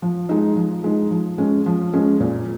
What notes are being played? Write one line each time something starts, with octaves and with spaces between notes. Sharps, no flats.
F3
G#3 D#4
F3
G#3 D#4
F3
G#3 C#4
F3
G#3 C#4
A#2